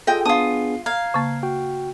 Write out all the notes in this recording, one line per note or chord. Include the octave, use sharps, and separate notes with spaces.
F4 G#4 A4 D#5 G5
B3 D4 F4 G#4 A5 D#6
F5 A#5 G#6
C#3 A#3
F#4 G5